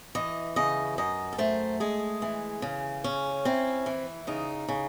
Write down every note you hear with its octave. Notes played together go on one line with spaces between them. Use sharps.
E3 D#5
C#3 D#5
F#2 D#5
A4
A3 C5
G#3 G#4
E3
C#3
C#4
C4 E4
E3
C#3 D#4
C#3